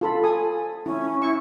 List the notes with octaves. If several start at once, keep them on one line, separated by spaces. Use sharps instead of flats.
F4 A4 B5
A4 G#5 D#6
C#4 E4
E4 C#6